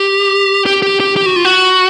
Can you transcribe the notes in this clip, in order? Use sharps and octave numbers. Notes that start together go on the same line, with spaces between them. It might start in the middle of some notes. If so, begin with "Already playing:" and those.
Already playing: G4
G4
G4
G4
G4
F#4
F4
F#4